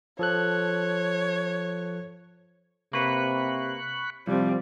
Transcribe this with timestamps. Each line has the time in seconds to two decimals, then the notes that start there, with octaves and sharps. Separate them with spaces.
0.19 F3 A4 C#5 F#6
2.93 C3 A#3 B4 B5 C#6 F#6
4.27 C2 F3 G3 C4